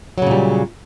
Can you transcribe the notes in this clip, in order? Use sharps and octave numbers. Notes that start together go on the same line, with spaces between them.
A#2 C#3 F#3 G3